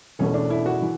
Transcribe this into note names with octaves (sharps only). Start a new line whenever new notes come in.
E1 E2 B2 A3 C#4
D4
E4
F#4
E3